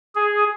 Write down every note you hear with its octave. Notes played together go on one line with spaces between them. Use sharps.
G#4